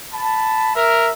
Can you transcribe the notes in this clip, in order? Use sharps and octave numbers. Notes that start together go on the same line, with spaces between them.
A5 B5
A#4 E5